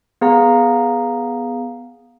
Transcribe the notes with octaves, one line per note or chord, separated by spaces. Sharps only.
B3 G#4 F5 A#5